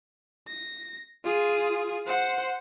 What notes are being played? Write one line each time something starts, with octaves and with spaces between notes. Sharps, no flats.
A#6
F4 G#4
C5 F#5